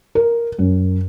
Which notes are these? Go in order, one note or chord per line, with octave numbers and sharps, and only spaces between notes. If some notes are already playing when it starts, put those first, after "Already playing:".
A#4
F#2